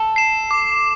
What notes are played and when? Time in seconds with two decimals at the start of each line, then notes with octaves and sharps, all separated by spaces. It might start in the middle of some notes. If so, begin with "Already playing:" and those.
Already playing: A4
0.16 C7 E7
0.51 D6